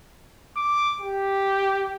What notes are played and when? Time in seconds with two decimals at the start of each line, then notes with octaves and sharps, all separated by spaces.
0.56 D6
1.01 G4